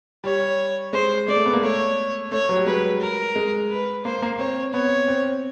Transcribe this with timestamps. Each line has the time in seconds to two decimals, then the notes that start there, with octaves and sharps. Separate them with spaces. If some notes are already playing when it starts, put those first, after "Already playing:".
0.24 G3 C#5
0.93 G#3 C5
1.28 G#3 D5
1.36 A3
1.46 B3
1.53 A#3
1.62 A3 C#5
2.32 A3 C#5
2.49 F#3
2.57 G3
2.66 G#3 B4
3.00 A#4
3.36 G#3
3.70 B4
4.04 A#3 C5
4.22 A#3
4.39 C4 C#5
4.73 B3 C#5
5.08 C4